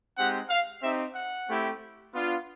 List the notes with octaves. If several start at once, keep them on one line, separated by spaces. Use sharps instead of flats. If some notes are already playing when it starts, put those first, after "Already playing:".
G#3 C4 D#4 G4 F#5
F5
C4 D#4 G4 E5
F#5
A3 C4 E4 G4
B3 D4 F4